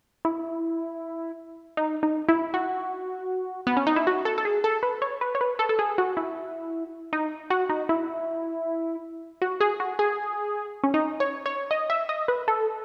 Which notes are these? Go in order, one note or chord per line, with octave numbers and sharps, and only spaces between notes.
E4
D#4
D#4
E4
F#4
B3
C#4
D#4
E4
F#4
A4
A4
G#4
A4
B4
C#5
B4
C#5
B4
A4
A4
G#4
F#4
E4
D#4
F#4
D#4
E4
F#4
G#4
F#4
G#4
C#4
D#4
C#5
C#5
D#5
E5
D#5
B4
A4